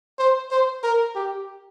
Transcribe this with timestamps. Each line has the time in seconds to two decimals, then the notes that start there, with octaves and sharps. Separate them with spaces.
0.19 C5
0.51 C5
0.83 A#4
1.15 G4